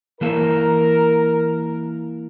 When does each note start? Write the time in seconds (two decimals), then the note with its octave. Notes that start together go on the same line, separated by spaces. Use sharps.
0.21 E3 A#3 A4 A#4